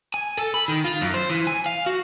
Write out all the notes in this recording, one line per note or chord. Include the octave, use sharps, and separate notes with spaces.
G#5
A4
B5
D#3
F4
F#2
C5
E3
G#5
F5
F#4